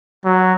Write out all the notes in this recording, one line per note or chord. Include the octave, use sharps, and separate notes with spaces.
F#3